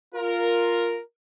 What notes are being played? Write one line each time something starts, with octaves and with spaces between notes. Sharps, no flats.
F4 A#4